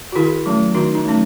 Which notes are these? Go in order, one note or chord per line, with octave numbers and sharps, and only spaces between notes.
F#4
D#3 E4 G#4
F#3 A3 C#4
D#3 D#4 F#4
D#4
F#3 A3 C#4